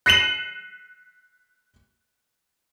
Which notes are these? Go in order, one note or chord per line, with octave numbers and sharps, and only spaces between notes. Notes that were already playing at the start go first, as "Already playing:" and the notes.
F#6 A#6 C7 D#7 E7 F#7